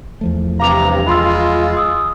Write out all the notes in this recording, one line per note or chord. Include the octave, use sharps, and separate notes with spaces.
E2 F3 A3
G2 C3 F5 A#5 D6 F7
G#3 F4 B5 C6 E6
D#6 E6